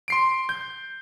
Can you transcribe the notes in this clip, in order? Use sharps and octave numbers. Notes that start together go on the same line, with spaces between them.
C6 C7 D7
G6